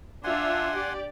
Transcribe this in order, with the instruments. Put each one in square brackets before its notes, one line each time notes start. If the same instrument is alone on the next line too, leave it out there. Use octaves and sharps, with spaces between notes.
[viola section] D4 F4 E5 [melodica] F#5 G#5 C6
[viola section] G4 D5